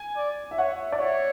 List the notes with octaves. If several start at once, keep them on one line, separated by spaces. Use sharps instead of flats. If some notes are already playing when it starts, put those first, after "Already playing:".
Already playing: G#5
D5
E5
C#5 F#5
D5
C#5 E5